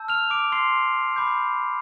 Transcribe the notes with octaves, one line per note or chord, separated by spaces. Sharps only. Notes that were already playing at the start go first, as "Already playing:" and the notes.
Already playing: A5 E6 G6
F6 F7
D6 D7
C6 C7
B5 D6 G6